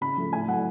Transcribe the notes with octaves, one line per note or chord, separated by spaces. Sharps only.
C#3 B5
F3 A3
A2 G#5
F#3 A3 F#5